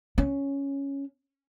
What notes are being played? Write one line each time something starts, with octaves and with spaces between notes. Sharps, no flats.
C#4